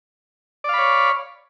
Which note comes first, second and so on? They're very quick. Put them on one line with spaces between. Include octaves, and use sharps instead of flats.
D5 F5 B5 C#5